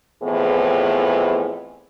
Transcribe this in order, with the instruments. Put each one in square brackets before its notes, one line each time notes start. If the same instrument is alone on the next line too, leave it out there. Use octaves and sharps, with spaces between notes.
[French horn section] F2 A2 E3 B3 G#4